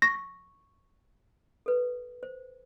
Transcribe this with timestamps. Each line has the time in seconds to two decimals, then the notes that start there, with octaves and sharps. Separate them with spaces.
0.02 C#6 A#6
1.66 A4 B4
2.23 C5